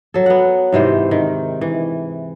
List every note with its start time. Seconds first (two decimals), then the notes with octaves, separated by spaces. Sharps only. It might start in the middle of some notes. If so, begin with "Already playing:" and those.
0.14 F#3 A4
0.26 B3 F#5
0.73 G#2 C3 E3 C5
1.11 D#3
1.61 E3